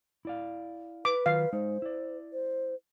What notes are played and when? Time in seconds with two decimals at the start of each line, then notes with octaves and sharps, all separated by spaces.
0.25 E4 D5 F5
1.05 B4 D6
1.26 D#3 F#3 F4 F5
1.53 G#3 D#4 C5
1.82 E4 D5
2.33 C5